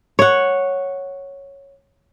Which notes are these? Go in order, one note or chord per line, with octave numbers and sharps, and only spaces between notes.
C#5 F#5